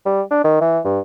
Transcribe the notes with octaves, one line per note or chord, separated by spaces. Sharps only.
G3
D4
D#3
E3
G2